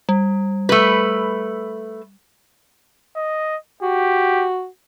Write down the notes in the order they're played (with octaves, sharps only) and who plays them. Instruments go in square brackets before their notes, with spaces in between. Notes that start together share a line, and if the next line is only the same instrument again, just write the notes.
[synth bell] G3
[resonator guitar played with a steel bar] A3 B4
[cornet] D#5
[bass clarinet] F#4 [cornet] G4